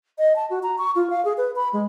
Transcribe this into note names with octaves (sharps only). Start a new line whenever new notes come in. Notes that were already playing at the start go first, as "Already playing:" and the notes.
D#5
A5
F#4
A#5
C#6
F4
F5
G#4
B4
B5
G#3